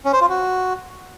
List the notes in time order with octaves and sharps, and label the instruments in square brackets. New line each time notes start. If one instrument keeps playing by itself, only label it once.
[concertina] C#4
C5
F4
F#4